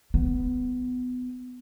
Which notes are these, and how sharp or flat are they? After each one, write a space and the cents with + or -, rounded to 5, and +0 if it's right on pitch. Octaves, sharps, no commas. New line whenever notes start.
B3 +20